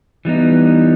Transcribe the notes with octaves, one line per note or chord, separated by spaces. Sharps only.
E3 G3 B3 D#4